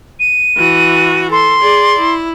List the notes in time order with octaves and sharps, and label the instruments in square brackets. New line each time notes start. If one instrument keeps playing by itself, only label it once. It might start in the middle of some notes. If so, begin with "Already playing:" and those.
[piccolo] D#7
[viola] E3 F#4
[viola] A4 [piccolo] C6
[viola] G#4 D5
E4